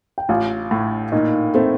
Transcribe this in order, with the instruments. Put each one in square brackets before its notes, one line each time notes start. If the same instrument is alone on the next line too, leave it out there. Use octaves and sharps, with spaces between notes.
[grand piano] G5
[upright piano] A1 [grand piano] F4 F5
[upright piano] A2
[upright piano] A#2 [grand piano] D#4 D#5
[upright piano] A3 [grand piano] C4 C5